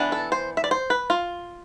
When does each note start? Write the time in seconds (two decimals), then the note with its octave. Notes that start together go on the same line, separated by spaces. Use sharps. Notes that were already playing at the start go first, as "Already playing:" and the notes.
Already playing: E3 B3 D4
0.12 A4
0.32 C5
0.57 E5
0.64 D5
0.71 C5
0.90 B4
1.10 F4